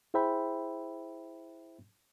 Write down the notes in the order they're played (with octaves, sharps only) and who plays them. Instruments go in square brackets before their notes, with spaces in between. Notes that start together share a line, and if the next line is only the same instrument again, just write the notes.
[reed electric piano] E4 G#4 C5 E5 G5 B5